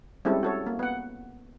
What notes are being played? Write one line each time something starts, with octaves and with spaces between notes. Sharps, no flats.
G3 G#3 C4 C#4 E4 A4
F#4 A4 C#5
A#3
B3 F#5